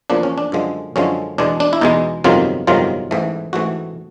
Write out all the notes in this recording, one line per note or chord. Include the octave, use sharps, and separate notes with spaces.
E2 C#3 F3 A#3 D4
C#4
D4
F#2 D3 F3 G#3
F#2 D3 F3 G#3 C#4
E2 B2 G#3 D4
D4
E4
E2 B2 G#3 D#4
G1 F2 C3 D#3 F#3 F4
G1 F2 C3 D#3 F#3 F4
A1 G#2 E3 A3
A1 G#2 E3 A3 F#4